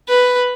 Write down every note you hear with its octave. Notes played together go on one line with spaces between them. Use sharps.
B4